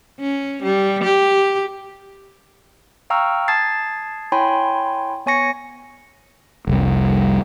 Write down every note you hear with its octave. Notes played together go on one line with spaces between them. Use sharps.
C#4
G3
G4
F5 G5 A#5 C#6 E6 F6
A5 D#6 G#6 A6 C7
E4 C#5 G5 G#5 B5 C6
B3 C#5 G#5 C#6 A#6 C#7
F1 C2 G3